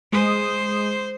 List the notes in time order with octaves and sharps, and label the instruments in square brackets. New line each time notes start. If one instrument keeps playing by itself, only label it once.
[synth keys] G#3 D#6 [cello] C5